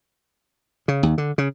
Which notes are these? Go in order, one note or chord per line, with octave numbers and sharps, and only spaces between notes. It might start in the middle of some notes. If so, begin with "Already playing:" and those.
C#3
D#2
D3
C#3